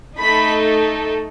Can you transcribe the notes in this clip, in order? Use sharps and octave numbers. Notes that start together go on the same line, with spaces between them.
A3 D#4 A4 B5